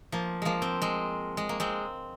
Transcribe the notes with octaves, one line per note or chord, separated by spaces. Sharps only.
F3 A#3
F3 G#3 A#3
C4
G#3 C4
G#3
A#3
G#3 C4